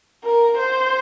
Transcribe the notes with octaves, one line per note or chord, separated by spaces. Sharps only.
A#4
C5